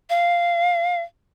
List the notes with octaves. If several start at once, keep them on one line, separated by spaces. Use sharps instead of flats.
F5